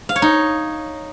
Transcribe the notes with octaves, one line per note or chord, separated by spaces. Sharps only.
F5
C#5
D#4